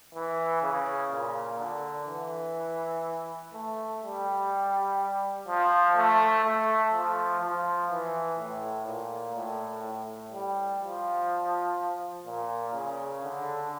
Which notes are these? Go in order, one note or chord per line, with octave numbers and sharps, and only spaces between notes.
E3
C#3
A#2
D3
E3
A3
G3
F3
A3
A3
F3
F3
E3
A2
A#2
A2
A2
G3
F3
A#2
C#3
D3